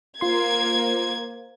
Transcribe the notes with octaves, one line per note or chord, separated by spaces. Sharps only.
A#3 F4 C5 C6 G#6